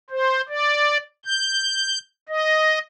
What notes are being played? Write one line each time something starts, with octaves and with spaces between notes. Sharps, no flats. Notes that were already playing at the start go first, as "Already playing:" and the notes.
C5
D5
G6
D#5